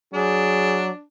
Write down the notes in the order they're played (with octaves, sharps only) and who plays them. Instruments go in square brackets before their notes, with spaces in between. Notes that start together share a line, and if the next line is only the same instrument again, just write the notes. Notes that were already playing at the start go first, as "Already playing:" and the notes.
[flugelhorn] F#3 [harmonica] D4 [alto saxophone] G#4